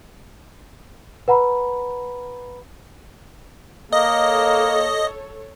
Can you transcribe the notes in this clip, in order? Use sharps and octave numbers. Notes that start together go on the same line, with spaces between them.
B4 F#5 A#5 B5
A#3 A4 C#5 D#5